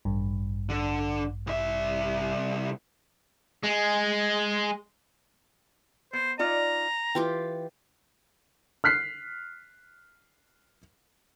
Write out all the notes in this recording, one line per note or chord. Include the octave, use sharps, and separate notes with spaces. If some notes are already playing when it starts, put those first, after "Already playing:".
A1 G2
D3
C2 E5
G#3
B3 C5
D#4 F4 D5 A#5
E3 F4 G4 G5
F6 F#6 B6 C7